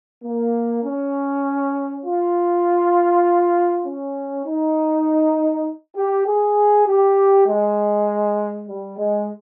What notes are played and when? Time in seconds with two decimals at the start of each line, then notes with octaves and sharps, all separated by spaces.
0.24 A#3
0.84 C#4
2.05 F4
3.85 C#4
4.46 D#4
5.96 G4
6.27 G#4
6.87 G4
7.46 G#3
8.67 G3
8.98 G#3